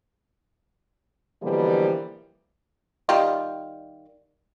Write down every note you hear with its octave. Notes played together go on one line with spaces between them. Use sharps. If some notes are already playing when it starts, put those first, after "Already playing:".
B2 D3 E3 F3 G3 A#3
D#3 G3 F4